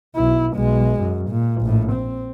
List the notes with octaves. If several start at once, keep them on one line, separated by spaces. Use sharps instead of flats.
B1 E4
B1 G#3
F#2
A#2
A#1 A2
C4